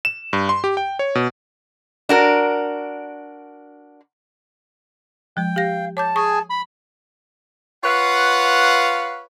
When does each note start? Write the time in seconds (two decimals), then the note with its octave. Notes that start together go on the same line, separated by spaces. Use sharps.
0.05 E7
0.33 G2
0.49 C6
0.64 G4
0.77 G5
0.99 C#5
1.15 B2
2.09 D4 F#4 A#4
5.37 F3 G#3 G5
5.56 G4 F5 A#6
5.97 C#5 A5 D6 G6
6.16 G#4 G#5 C#6
6.50 B5
7.84 F4 B4 C#5 F5 F#5